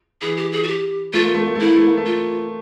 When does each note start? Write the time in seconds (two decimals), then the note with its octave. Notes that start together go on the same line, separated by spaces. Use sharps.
0.21 E3 G#4
0.37 G4
0.52 G#4
0.63 F#4
0.68 G4
1.13 A3 F4
1.24 A#3
1.34 A3
1.45 A#3
1.55 A3
1.60 E4
1.66 A#3
1.76 A3
1.87 A#3
1.97 A3
2.06 F4